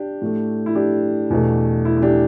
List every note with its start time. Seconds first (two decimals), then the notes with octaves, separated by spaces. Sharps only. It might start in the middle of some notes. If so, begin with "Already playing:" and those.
Already playing: D4 G4
0.22 A2 A3
0.66 E4
0.75 D4 G4
1.30 E2 B2 A3
1.85 E4
1.97 E4
2.02 D4 G4